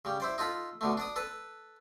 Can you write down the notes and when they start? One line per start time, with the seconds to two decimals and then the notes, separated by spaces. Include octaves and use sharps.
0.05 C#3 G3
0.20 E4 C5 D5
0.38 D#4 F4 A4 B5
0.81 B2 D3 A3
0.97 D4 D5 D#6
1.16 A4 B4 A5